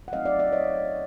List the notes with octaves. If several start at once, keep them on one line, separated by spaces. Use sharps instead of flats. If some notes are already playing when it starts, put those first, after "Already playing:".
F#5
F#3 A3 C4 D#4 D#5 F5
D5 E5
D5 E5
C#5 D#5